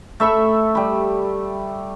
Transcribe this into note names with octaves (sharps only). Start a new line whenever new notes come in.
A3 E5 B5 C#6
G3 B5